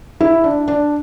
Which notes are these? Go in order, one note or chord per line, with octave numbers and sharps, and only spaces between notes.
E4
D4
D4